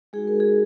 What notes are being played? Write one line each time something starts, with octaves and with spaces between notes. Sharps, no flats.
G#3 D#4 F#4 G#4
A#4
G#4